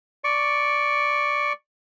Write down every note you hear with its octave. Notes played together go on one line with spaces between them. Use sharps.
D5 C#6